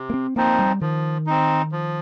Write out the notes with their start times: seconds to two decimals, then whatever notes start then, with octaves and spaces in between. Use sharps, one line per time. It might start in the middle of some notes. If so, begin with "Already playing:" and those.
Already playing: C3
0.10 A#3
0.14 C4
0.36 F3 A#3 C4 D#4
0.59 G3
0.81 D#3 F3
1.26 C4 D#4
1.72 F3